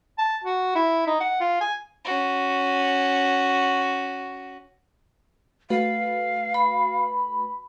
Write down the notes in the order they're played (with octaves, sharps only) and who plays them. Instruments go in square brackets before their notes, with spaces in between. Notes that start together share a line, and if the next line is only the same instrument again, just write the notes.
[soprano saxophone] A5
F#4
E4
D#4
F#5
F4
G#5
[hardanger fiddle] C#4 F#4
[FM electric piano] A3 F#4 B4 [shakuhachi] F5
[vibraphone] B5